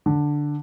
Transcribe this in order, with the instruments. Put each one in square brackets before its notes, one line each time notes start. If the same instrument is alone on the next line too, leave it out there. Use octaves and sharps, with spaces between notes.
[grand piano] D3